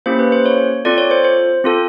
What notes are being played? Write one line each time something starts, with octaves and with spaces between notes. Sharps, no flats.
A#3 C#4 E4 G4 C5
B4
C5
C#5
C4 F4 A4 D5
C#5
C5
C5
C4 F4 A4